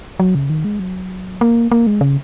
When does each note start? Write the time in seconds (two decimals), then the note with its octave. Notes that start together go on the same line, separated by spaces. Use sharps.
0.20 F#3
0.35 C#3
0.50 D#3
0.65 G#3
0.80 F#3
1.41 A#3
1.72 A#3
1.87 G#3
2.01 C#3